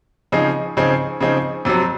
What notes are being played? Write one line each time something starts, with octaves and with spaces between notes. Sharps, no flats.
C#3 F3 C4 D#4 G#4
C#3 F3 C4 D#4 G#4
C#3 F3 C4 D#4 G#4
F2 C3 F#3